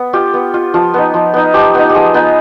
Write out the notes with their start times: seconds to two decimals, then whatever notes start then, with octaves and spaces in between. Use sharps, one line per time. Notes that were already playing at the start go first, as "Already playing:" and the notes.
Already playing: B3
0.13 F4 G4
0.34 B3
0.54 F4
0.74 F3 F4
0.94 B3 D#4
1.14 F3
1.34 B3 D#4
1.54 F3 G4
1.74 B3 D#4
1.89 G4
1.95 F3 G#4
2.14 B3 D#4